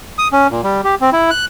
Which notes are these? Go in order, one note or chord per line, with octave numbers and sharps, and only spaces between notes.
D#6
C#4
A#2
G3
G4
C4
E4
F#6